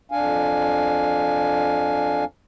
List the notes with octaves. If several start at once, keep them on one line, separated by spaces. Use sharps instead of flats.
F2 D4 F5 G#5